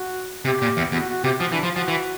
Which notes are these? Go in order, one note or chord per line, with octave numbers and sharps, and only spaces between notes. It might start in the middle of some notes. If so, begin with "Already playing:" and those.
Already playing: F#4
C3 G4
A#2
E2
E2 F#4
F#4
C3 G4
F3 F#4
E3 D4
F3 F4
F3 F#4
E3